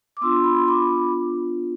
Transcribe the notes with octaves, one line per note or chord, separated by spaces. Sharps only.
D6
B3 D4 F4 C6 E6
B5
C6
B5 D6